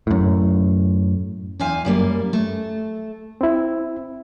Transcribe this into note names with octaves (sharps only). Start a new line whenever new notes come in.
F#2 A2
E2 C4 E5 F5 G#5
F#2 G3 A#3
A3
C4 E4